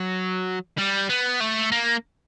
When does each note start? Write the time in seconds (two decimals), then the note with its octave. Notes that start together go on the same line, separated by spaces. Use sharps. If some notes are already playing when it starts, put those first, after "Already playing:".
Already playing: F#3
0.78 G3
1.09 B3
1.40 A3
1.72 A#3